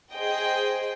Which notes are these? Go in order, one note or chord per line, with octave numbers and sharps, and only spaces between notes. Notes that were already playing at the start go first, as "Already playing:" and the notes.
G#4 C5 D#5 G5